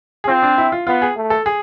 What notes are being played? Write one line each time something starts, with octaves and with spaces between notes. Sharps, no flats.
G#4
C4 F4
D4
E4
F4
B3 F4
G#4
A3
A4
G#4